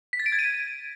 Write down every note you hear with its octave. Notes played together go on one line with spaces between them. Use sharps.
B6
A6
D7
G#6
D#7